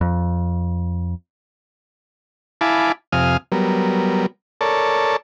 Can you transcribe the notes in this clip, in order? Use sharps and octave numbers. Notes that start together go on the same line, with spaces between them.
F2
E4 F5 G#5 A5 B5 D6
F2 C3 F5 G#5 D#6 F6
F#3 G3 B3 A#4
A4 A#4 C#5 D5 A5